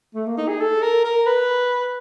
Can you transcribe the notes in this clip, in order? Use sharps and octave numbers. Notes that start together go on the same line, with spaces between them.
A3
A#3
D#4
G#4
A4
A#4
A#4
B4